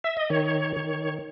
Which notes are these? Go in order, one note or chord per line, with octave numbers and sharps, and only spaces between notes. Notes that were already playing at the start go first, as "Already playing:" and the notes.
E5
D#5
D#3 C#5
D#3